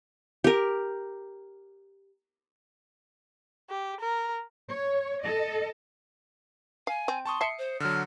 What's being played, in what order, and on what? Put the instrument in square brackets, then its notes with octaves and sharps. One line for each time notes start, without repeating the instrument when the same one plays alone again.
[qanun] G4 A#4
[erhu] G4
A#4
[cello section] C#5
A4 D#5
[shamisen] F5 [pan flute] G#5
[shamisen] C4
[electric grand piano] A5 C#6 D#6 [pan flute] C6
[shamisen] E5 A5 [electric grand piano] C7 C#7
[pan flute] C5
[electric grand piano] D3 F#3 [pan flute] F6